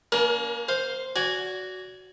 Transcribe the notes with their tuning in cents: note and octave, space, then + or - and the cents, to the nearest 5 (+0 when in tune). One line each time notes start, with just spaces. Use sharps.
A#3 +10 C#4 +40 A#4 +45
C5 +0 F5 +5
F#4 +0 D5 -30 G#5 +0